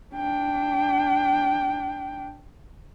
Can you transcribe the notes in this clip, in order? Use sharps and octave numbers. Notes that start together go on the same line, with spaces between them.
D4 G5